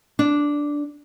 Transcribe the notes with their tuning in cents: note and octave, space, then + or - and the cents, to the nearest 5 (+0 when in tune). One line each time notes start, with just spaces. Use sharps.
D4 -5